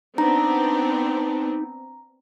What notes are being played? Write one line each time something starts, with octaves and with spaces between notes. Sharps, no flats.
B3 C4 D4 D#4 A#5